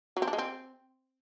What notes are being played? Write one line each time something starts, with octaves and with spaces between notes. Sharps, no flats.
F#3
C4
D4
G#3
C4